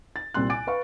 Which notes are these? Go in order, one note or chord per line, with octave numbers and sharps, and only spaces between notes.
A6
C2 A#2 G3 C4 C6 F#6
G#5 D6 A6 D7
B4 F5 C#6